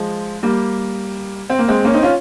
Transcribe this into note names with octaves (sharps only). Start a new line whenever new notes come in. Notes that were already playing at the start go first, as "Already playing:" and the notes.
Already playing: F3 G#3
G3 A#3
C4
A#3
G#3 C4
A#3 C#4
C4 D#4
C#4 F4